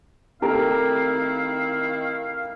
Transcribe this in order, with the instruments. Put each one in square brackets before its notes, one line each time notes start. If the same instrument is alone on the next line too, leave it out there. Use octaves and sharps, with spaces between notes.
[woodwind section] D#3 C4 E4 [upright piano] A3 G4 A#4 [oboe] F5